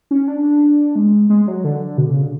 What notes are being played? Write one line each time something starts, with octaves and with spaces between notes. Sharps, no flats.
C#4
D4
G#3
G#3
F#3
D3
B2
C#3
D3